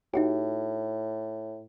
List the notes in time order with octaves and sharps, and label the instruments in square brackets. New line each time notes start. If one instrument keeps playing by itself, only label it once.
[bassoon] A2 [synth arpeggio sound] D#4 F#4 G4